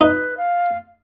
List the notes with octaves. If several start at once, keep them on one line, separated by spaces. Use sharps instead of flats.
D#4 B4
F5